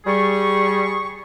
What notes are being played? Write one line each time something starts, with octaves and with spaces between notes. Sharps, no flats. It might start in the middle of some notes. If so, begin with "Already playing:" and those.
G3 G#4 C#6